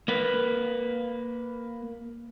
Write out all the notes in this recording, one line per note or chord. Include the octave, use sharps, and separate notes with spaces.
A#3 B4